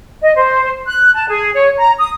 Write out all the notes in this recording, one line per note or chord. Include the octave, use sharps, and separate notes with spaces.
D#5
C5
F#6
A5
G#4
C#5
A#5
D#6